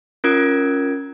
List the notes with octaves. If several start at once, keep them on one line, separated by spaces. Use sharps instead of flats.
C#4 F4 A#4 G#6 D7